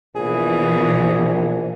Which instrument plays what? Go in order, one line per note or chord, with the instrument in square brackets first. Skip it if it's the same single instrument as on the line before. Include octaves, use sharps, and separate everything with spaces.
[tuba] A#1 [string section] B2 E3 [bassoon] G#4